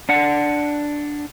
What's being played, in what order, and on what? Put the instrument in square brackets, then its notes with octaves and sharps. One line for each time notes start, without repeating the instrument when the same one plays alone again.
[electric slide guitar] D4 F#5